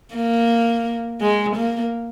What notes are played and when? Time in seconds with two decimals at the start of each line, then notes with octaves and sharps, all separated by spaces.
0.14 A#3
1.21 G#3
1.56 A#3